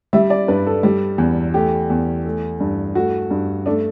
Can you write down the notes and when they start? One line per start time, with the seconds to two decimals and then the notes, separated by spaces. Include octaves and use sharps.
0.13 G3 E5
0.30 D5
0.48 G2 B4
0.66 A4
0.83 G3
1.18 E2
1.54 A3 G4
1.90 E2
2.25 A3
2.60 G2
2.95 A3 F#4
3.31 G2
3.66 A3 D4